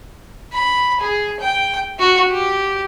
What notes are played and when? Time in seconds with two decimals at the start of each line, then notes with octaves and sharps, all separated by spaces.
0.53 B5
1.01 G#4
1.40 G5
1.99 F#4
2.30 G4